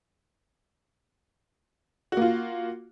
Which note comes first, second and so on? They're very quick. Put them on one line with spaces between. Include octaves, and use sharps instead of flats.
F#4 A#3 F4